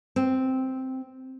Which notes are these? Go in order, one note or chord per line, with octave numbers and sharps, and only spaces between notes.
C4